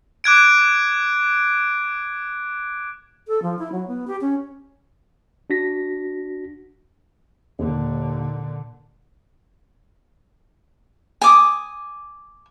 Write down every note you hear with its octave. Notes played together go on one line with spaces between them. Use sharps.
D6 F#6 G#6 D7
A4
F3
E4
F#3
B3
G4
C#4
D4 F#4 A#6 B6
D#2 A#2 D3
G#5 D6 D#6